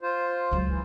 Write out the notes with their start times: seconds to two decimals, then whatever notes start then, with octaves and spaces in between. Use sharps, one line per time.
0.01 F4 C5
0.51 C#2 F#3
0.68 E3